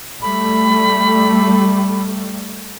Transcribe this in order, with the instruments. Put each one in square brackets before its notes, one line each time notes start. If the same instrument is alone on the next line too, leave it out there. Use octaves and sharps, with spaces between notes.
[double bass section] G3 A3 [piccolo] B5